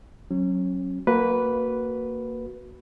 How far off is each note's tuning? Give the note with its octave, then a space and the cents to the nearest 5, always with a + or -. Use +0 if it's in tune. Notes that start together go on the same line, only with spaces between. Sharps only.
F#3 +0 C#4 -30
A#3 -15 F#4 +0 B4 +0